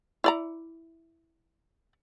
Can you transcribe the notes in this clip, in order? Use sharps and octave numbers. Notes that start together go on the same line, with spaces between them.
E4 D5 A#5